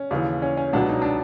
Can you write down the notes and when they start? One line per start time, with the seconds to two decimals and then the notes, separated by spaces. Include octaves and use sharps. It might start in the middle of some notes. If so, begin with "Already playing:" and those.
Already playing: C#4
0.11 D#2 C#3 E3
0.42 C#4
0.57 C#4
0.73 C#2 B2 F#3 D4
0.89 D#4
1.02 D4